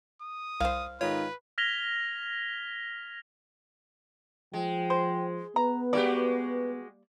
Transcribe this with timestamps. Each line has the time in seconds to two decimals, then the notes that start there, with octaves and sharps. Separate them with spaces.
0.22 D#6
0.60 C2 C5 F5
1.01 G#2 D#3 F4 B4 C#5
1.58 F6 G#6 A#6 B6 F7 G7
4.53 F3 G#3 G5
4.90 C5
5.56 B3 B4 A#5
5.93 G3 G#3 A#3 F#4 G4 D5